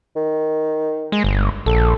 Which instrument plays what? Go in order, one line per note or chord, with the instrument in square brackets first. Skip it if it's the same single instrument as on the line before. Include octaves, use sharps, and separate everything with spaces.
[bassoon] D#3
[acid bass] G#3
G1
[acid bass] A#1 [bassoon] A4